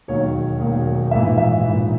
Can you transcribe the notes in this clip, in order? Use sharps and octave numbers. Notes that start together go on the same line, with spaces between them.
E1 D#2 D#3 F#3 C#5
E1 D#2 D#3 F#3
A#1 G#2 E3 E5
E5
A#1 G#2 E3